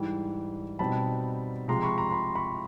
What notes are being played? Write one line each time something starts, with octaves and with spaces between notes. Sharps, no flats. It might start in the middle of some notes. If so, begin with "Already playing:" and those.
Already playing: G#2 E3 G3
B2 G3 C4 D#4 A5 B5
C3 F3 G#3 A#5 C6
B5 C#6
A#5 C6
C6
B5 C#6
B5 C#6